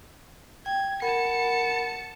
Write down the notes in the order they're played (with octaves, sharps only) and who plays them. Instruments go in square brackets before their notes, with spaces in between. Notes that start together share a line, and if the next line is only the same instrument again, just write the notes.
[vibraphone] G5 [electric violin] G#6
[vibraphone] A#4 F#5 B5 [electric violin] A5 C#7